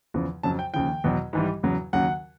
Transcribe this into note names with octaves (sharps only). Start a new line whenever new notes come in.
E2 C#3 F3
F2 C#3 F#3 A5
G5
D#2 C#3 F3 G5
E2 B2 F#3
G#2 E3 G3
E2 C#3 F#3
D#2 C#3 F#3 F#5